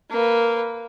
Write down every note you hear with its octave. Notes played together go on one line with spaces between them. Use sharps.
A#3 B4